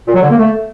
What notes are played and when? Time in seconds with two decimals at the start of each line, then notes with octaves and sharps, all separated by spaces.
0.07 A#2
0.14 F#3
0.22 D3
0.30 A#3
0.38 A3